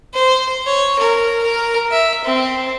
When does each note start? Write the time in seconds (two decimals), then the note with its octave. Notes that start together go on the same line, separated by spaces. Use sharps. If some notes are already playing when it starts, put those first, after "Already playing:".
0.13 C5
0.66 C#5
0.99 A#4
1.43 A#4
1.91 E5
2.24 C4